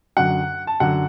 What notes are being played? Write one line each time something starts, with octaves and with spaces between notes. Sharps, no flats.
F#2 D3 F#3 F#5
A5
F#2 D3 F#3 F#5